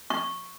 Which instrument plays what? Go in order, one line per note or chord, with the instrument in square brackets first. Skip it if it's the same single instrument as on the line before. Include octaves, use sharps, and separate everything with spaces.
[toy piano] C#6